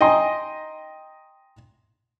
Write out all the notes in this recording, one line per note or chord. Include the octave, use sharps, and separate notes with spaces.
D#5 G5 G#5 A#5 C6 D#6